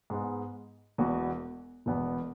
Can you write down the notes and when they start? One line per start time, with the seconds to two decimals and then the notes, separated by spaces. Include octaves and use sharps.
0.10 G#2 G#3 B3
0.98 E1 E2 B2 B3 F#4
1.86 E1 E2 B2 B3